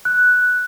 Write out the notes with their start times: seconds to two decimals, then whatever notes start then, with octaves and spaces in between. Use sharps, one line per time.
0.05 F#6